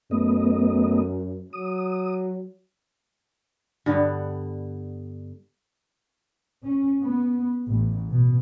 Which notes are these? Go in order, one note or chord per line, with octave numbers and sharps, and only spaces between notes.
F#2 A3 B3 D#5
F#3 D#6
G2 D3 B3 G5
C#4
B3
A1
B2